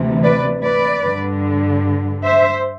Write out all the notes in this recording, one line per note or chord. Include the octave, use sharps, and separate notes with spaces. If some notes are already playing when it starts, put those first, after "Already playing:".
Already playing: D2 C3 E3
B4 D5
B4 D5
G2 D3
C5 E5